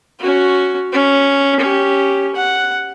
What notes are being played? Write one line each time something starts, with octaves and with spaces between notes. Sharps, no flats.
C#4 F#4
C#4
C#4 G4
F#5